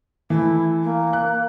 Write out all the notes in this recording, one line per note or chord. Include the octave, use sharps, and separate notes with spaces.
E3 A3 E4
A#3
F#6